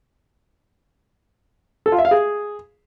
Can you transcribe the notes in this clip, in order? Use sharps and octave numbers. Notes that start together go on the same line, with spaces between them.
A4
F4
E5
F5
G#4